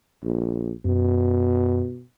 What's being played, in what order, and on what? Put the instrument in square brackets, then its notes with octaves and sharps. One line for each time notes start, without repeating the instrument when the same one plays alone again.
[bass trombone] A#1
[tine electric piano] F#2 [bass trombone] B2